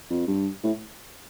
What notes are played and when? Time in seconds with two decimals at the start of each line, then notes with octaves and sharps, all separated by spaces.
0.10 F2
0.27 G2
0.64 A2